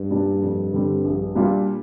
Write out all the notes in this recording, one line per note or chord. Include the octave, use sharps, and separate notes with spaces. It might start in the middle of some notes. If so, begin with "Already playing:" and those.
Already playing: G2
A#2 G3 D4
F2
D3 G3 C4
A#1
A#2 G3 D4 F4